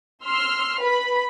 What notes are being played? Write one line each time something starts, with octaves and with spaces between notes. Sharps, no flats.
C6 E6 F6
B4 B5